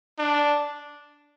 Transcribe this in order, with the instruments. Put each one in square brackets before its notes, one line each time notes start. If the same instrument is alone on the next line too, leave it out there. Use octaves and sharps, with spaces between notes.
[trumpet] D4